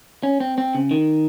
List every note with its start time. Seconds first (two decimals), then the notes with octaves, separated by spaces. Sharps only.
0.23 C#4
0.40 C4
0.58 C4
0.75 C#3
0.91 D#3